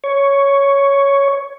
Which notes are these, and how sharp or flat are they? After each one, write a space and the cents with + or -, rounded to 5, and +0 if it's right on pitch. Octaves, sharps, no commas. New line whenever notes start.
C#5 +5